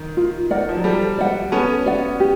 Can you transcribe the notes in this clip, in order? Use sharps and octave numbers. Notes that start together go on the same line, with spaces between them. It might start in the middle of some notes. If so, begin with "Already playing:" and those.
Already playing: D#3
F4
A#4 D5 F#5
F3
F#3
F3 G3 A4
D5 F#5
B3 C#4 A4
D5 F#5
G4